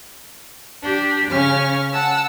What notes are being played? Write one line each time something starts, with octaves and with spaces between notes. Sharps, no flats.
D4 G4
C#3 C#4 F6
F#5 A5 E6